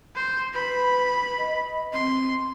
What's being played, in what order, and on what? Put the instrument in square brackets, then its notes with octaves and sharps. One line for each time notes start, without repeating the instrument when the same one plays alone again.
[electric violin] C5
[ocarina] B4 [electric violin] B5
[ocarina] D#5
[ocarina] C4 [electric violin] C6